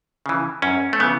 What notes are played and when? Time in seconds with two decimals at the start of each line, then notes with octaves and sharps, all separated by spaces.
0.26 C#3 E3
0.62 F#2 C#4
0.93 A3
1.00 C#3 E3 B3